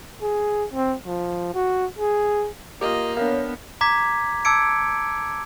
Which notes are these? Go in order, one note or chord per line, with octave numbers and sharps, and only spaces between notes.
G#4
C4
F3
F#4
G#4
A#3 F4 G4 D#5
B3 D4 A#4 C#5 F5
A#5 D6 G#6 B6
A5 D6 E6 G#6 C#7 D7